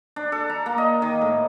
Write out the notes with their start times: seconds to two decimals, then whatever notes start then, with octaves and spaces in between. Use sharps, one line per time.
0.16 D4
0.32 A4
0.49 A#5
0.66 A#3
0.78 D#5
1.02 D#3
1.21 A2